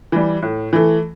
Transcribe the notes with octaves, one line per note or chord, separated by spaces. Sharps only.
E3 G3
A2
E3 A3